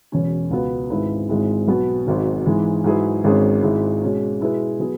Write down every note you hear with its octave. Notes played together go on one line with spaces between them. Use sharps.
E1 E2 B2 F#3 C#4
C#2 B2 B3 F#4 B4
G#1 G#2 G#3 E4 B4
G#1 G#2 G#3 E4
B1 B2 B3
G#1 G#2 F#3
G#2 E3 G#3
G#2 F#3 E4 G#4 B4
G#1 G#2 G#3 C#4 G#4
G#1 G#2 G#3 E4
B2 G#3 C#4
B2 G#3 E4 B4
F#3 B3 G#4